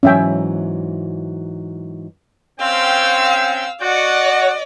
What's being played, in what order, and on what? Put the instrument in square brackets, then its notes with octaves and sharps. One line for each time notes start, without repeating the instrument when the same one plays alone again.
[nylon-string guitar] G#2 E3 F#3 [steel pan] C#4 E5 G5
[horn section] C4 C#4 G5 [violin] F5 E6
[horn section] F#4 F#5 [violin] D5 D#5